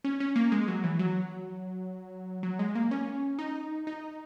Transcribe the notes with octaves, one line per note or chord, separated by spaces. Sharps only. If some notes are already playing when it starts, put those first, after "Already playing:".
C#4
C#4
A#3
G#3
F#3
E3
F#3
F#3
G#3
A#3
C#4
D#4
D#4